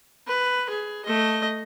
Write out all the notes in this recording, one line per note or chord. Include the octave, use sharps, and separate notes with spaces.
B4
G#4
A3 D#5